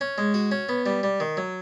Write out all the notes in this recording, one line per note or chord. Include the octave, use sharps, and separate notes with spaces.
C#4
G#3
F#4
C#4
B3
G3
G3
D#3
F#3